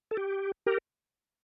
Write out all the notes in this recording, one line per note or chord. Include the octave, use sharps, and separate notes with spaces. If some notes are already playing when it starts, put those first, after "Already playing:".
A4
G4
G4 A#4